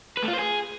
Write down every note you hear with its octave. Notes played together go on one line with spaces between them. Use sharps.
B4
A3
F4
C5
G#4